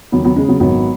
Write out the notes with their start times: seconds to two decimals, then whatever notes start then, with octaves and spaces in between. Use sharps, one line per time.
0.12 D#2 F#3 B3
0.24 F#3 B3
0.36 C#3 G#3
0.48 F#3 B3
0.60 G#1 F#3 B3